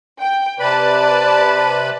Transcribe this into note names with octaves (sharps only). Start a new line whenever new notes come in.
G5
C3 B4 D5 A5 B5